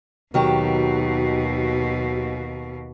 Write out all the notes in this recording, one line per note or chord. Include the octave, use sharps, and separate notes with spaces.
D#2 B2 D#3 F#3 G4